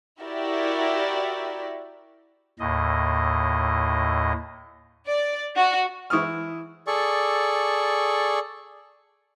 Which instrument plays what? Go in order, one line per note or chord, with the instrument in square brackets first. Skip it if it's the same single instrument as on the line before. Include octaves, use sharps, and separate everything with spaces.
[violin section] E4 F#4 G4 A#4 D5 E5
[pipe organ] D#2 A2 D#5
[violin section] D5
F#4
[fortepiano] E3 E4 C#6 D#6 F6
[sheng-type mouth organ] G#4 A4 D5 C#6